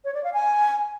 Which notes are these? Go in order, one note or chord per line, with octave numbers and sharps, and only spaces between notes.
C#5
D5
F5
G#5